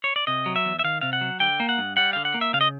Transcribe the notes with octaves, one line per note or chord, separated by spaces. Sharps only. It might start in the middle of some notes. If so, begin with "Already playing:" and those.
C#5
D5
C3 D#5
F#3
E5
E2
E5
D#3 F5
C3 F5
F#5
F#3
D3 G5
A#3
F#5
G2
G3 F#5
D3 F5
F#5
A#3
E5
C#3 F5
D#5